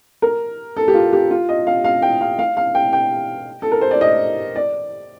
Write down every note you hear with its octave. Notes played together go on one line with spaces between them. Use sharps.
A#4
A4
G4
F4
G4
F4
D#5
F5
F5
G5
F5
F5
F5
G5
G5
A4
A#4
C5
D5
D#5
D5